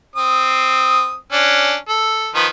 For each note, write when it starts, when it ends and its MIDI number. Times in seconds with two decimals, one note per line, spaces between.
0.16 1.15 60
0.16 1.15 87
1.32 1.75 61
1.32 1.75 62
1.88 2.30 69
2.35 2.47 51
2.35 2.47 53
2.35 2.47 71